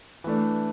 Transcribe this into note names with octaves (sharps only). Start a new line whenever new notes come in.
E3 A3 D4